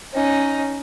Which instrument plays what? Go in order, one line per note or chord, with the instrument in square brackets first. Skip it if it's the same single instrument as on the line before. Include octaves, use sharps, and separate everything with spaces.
[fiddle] C#4 D#4